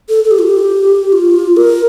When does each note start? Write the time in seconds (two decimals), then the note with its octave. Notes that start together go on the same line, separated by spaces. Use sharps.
0.09 A4
0.24 A4
0.31 G4
0.39 F4
0.46 G4
1.13 F4
1.57 A#4